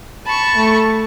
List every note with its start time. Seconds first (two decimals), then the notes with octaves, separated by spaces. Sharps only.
0.25 A5 B5 C#6
0.55 A3